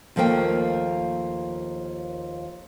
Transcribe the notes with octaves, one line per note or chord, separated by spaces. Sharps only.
D#2 F3 A3 A#3 G5